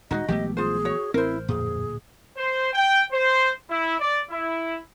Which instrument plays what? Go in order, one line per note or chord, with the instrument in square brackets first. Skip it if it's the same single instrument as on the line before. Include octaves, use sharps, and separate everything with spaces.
[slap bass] D#1 C3 G#3 [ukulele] D#4 F#4 [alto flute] D#5
[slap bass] A#1 G#3 A3 [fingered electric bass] E3 F#3 B3 [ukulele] G4
[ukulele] F4 C5 [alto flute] G#4
[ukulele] F#4 C#5
[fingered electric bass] A1 [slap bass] C4 [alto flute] E4 [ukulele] A#4 C5
[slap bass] D1 A#2 [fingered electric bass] F2 [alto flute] G#4
[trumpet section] C5
G5
C5
E4
D5
E4